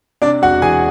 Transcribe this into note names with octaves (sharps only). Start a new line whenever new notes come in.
C3 D4 D5
E1 F#4 F#5
E3 G#4 G#5